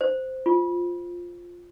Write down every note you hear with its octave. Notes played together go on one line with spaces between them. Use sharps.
C5
F4